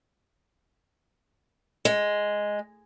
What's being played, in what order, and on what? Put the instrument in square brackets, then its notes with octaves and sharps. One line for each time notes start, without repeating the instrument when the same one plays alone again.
[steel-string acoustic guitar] G#3